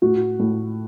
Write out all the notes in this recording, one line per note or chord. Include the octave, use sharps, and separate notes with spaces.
A2 F#4
A2